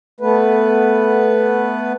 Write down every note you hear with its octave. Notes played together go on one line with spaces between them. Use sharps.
A3 B3 B4